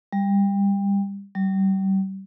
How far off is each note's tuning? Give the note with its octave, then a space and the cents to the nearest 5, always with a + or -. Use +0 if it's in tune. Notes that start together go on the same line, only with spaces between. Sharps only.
G3 +25
G3 -30